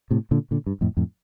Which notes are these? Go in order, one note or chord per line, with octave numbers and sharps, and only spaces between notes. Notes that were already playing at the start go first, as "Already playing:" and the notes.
A2 C3
A#2 D3
A#2 D3
G2
F2 A2
F2 A2